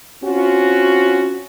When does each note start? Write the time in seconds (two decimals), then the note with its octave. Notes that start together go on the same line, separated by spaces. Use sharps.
0.23 C4 C#4 F4 F#4